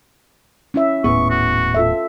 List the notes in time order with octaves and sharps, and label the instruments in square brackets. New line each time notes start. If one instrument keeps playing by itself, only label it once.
[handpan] C#4 E4 E5
[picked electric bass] D#1 A2 B3 [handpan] G#4 B4 [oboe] C#6
[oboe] F#4
[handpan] F4 A4 E5